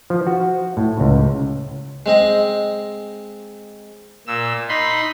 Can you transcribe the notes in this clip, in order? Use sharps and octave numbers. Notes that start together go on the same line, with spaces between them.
F3
F#4
A2
C#2
G#3 C4 D#5
A#2 E6
D#4 B5 C6